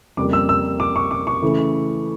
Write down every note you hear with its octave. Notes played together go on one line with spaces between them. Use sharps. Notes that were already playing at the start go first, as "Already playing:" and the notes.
F2 C#3 G3 A#3 D6
E6
E6
D6
C#6
D6
C#6
C#3 E3 A3